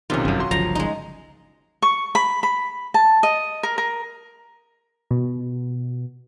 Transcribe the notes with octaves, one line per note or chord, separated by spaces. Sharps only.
B1 C3 D#3 C#4 F4
G1 F#2
F#3 C6
G1 C#2 F3 A#5
G#3 D#4
C#6
B5
B5
A5
D#5
A#4
A#4
B2